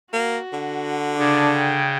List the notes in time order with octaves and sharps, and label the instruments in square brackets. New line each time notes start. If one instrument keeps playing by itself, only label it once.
[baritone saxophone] A#3 [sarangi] F#4
[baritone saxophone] D3
[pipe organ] C#3 [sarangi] D4
[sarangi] G5